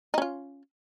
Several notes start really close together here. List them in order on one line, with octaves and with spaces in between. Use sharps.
D#4 C#4 F4